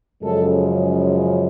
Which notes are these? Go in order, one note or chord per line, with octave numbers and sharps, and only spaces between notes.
F#2 C#3 F3 G#3 A4